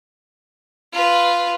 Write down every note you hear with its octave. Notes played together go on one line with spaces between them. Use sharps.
F4 B4